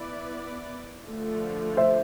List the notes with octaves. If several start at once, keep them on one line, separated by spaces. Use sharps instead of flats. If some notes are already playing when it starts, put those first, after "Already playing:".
Already playing: B3 E4 B4 D5
D3 F3 A3
C5 E5